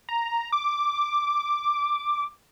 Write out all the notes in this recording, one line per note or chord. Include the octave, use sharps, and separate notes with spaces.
A#5
D6